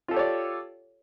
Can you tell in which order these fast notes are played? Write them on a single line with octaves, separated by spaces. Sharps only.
F4 A4 G4 C#5 D5